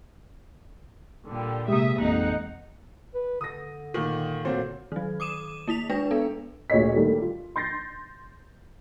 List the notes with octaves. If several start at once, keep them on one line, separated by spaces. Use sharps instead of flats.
A#2 D3 G3
C3 G#3 A#3 G4 E5 D#6
A1 F2 A#3 D#4 F#5
B4
D3 D#6 A#6
A#2 D#3
A#2 D3 F#3 C4
D#3 F#3
D6 D#6 D#7 E7
A#3 E4 B6 F7
G#3 D4 B4 A#6
B3 A4
D2 A#2 G#4 C#5 D#5 B6
D3 D#3 G3 A3 A#3
F4
C6 G6 A6 A#6 C7